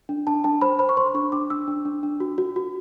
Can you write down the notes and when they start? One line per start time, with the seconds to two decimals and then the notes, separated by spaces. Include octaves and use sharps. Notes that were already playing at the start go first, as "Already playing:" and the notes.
0.09 D4
0.27 D4 A5
0.44 D4 A5
0.61 C5 B5
0.79 C5 B5
0.89 C#6
0.97 C5 C6
1.15 D4 C#6
1.32 D4 D6
1.50 D4 E6
1.67 D4
1.85 D4
2.03 D4
2.20 F#4
2.38 F#4
2.56 F#4